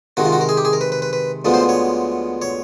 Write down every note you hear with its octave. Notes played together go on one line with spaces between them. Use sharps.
C3 D#3 G#3 F#4
F4
F#4
A#4
G#4
G4
G#4
A#4
B4
B4
B4
B4
D2 D3 F3 G#3 B3
C5
C#5
C#5